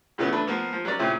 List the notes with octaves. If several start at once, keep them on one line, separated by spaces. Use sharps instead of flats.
A#2 C#3 E3 A3 B3 C#4
A3 D4 B4
F3 A#3 B3
F3
F#3 C#4 A#4 D5
A#2 C#3 C4 C#4 E4 G4